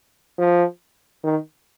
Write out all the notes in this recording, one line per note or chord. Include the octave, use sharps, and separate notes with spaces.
F3
D#3